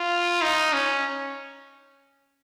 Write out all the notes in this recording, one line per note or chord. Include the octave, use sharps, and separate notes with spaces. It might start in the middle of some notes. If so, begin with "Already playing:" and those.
Already playing: F4
D#4
C#4